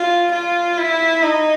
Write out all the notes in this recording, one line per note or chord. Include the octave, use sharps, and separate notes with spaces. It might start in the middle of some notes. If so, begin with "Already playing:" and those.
Already playing: F4
F4
E4
D#4